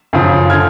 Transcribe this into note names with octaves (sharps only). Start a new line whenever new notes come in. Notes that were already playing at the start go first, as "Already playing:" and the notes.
F#2 C#3 F3
D3 F3 F6 G#6